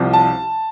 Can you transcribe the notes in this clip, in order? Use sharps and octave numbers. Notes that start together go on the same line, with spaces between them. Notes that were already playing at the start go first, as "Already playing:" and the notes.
Already playing: C2 C3 F3
A5